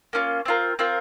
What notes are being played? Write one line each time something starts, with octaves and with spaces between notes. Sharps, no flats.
A#3 C#4 F4
C4 F4 A#4
C4 F4 A#4